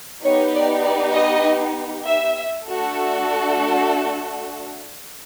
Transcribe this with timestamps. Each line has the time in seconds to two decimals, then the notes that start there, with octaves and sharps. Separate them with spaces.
0.24 B3 D#4 G4 C#5
0.55 D5
0.85 D5
1.15 D#5
2.07 E5
2.68 A3 D4 F#4 A4